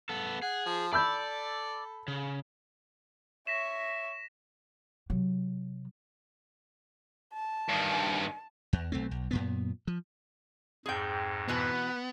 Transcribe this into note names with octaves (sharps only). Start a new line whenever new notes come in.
B3 A4
G#4 F#5
F3
A4 D5 B5 E6 G6
C#3
C#5 E5 A#6 B6 E7
C3 F#3
A5
G2 D#3
E2
B1 A3 C4
B1
F#2 A#2 B3
F3
F2 G#2 G#4 G5
B2 E3 B3 F#4 B4